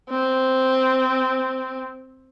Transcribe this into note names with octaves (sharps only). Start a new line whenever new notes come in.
C4